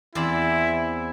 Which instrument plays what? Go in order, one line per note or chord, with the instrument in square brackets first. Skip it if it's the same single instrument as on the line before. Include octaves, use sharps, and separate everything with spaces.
[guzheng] E2 C4 D5 [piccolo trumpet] E4